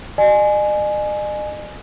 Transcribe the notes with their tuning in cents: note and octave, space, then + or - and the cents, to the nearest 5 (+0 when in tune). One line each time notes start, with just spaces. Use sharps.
D#5 -45 G#5 +10